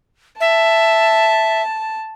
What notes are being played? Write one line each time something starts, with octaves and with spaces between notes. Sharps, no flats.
E5 A5